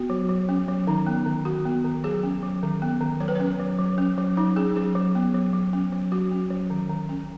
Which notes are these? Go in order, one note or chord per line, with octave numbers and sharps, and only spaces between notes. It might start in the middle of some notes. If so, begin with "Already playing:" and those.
Already playing: B3 F#4
F#3
F#3
C#4
F#3
D#3 D#4
B3
D#3
D#3 F#4
B3
D#3
F#3 G#4
C#4
F#3
D#3
B3
D#3
F#3 C#5
B4
C#4 C#5
F#3
F#3
C#4
F#3
F#3 D#4
C#4 G#4
F#3 G#4
F#3
B3
F#3
F#3
C#4
F#3
F#3 F#4
C#4
F#3
D#3
D#3
C#4